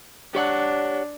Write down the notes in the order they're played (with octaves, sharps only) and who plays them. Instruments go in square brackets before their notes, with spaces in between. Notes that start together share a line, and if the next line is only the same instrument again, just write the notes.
[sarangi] D4 [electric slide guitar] G4 C#5 F#5